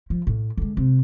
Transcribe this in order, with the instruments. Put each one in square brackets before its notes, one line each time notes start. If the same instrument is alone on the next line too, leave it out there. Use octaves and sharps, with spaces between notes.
[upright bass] F3
A2
D3 G#3
C3